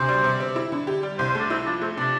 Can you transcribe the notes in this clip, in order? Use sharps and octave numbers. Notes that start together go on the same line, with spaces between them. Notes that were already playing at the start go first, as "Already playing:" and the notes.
Already playing: D2 C3 C5
G3
C3
C4
E4
D3
G4
G3
C2 C5
C5
A3 D4
C4 E4
F3 D4
A3 C4
C3 D4